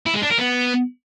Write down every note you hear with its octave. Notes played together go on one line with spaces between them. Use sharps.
E4
G#3
D4
A#4
B3